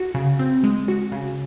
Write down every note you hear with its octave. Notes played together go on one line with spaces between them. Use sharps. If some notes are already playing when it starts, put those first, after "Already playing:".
Already playing: F#4
C#3
C4
G#3
F#4
C#3